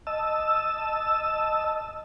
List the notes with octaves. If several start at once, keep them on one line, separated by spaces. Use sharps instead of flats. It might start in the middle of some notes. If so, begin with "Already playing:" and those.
D#5 A5 E6